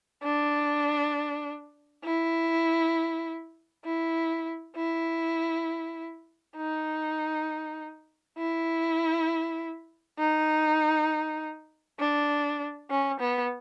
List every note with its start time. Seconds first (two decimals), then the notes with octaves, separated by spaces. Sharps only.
0.23 D4
2.04 E4
3.85 E4
4.76 E4
6.57 D#4
8.38 E4
10.19 D#4
11.99 D4
12.90 C#4
13.20 B3